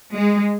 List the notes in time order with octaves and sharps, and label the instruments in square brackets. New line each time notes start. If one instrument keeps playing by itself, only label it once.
[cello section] G#3